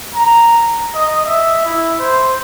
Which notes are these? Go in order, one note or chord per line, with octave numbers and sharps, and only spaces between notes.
A#5
D#5
E5
E4
C5